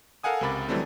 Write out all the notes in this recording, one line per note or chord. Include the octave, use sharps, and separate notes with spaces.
A4 A#4 F5 F#5 G#5 D#6
C#2 C3 A#4 B5 D6 A6
D3 E3 F#3 G3 A3 C4